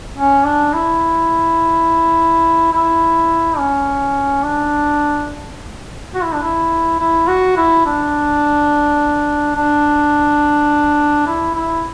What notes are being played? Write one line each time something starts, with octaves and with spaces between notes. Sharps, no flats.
C#4
D4
E4
E4
C#4
D4
F#4
E4
D4
E4
E4
F#4
E4
D4
D4
E4
E4